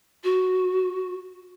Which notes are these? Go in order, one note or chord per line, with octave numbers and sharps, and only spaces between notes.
F#4